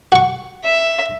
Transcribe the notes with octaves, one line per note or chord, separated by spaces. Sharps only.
F#4 C#6
E5